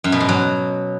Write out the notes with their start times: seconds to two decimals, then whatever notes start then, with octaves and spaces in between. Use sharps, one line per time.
0.04 F#2
0.12 B2
0.20 G#2
0.29 F#3